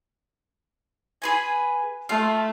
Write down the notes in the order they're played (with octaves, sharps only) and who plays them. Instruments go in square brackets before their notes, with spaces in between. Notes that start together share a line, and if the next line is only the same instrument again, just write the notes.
[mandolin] G#4 B4 G#5
[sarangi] A3 [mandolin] F4